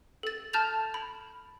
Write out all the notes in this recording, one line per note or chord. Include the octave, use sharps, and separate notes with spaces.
A4 A6
A5 F6 G6 A6 F7
B5